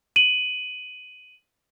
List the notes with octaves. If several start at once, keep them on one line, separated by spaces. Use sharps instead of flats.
D#7 F#7